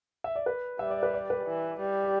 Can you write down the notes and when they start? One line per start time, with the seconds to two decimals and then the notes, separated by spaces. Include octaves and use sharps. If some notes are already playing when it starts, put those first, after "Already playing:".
0.24 E5
0.36 D5
0.46 B4
0.79 G3 E5
0.90 D5
1.03 B4
1.14 D5
1.30 B4
1.46 E3
1.80 G3
2.04 G4